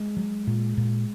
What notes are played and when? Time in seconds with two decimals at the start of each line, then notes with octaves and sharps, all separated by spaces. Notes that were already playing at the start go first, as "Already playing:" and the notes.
Already playing: G#3
0.17 F#3
0.47 A#2
0.77 A#2